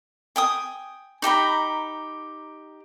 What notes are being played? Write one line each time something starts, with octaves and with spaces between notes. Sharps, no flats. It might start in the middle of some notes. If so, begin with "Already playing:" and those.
G5 G#5 D#6
D#4 G4 A#5 B5